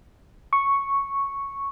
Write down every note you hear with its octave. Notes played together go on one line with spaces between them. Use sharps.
C#6